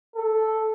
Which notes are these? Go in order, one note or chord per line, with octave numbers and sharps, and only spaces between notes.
A4